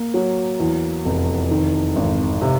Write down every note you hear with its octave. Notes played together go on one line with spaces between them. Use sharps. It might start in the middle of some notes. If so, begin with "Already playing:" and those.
Already playing: A#3
F#3
E2
F1
D#3
G#1
C3